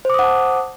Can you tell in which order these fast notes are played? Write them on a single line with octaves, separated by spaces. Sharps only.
C5 D6 D#6 F#5 A5